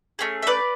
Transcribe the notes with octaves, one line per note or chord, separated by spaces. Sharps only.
A3 C#4 G#4
E5
B4 D5